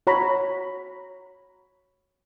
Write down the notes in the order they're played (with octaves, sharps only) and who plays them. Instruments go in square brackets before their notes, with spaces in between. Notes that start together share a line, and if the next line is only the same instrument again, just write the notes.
[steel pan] F#4 C#5 A#5 B5